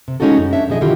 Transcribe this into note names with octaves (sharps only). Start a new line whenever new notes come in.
C3
G#3 C#4 D#4 F4 F#4 A4
F#2
D4 C#5 E5
B2 F3 G#4 D#5
D3 D#3 F#3 E4 F4 G4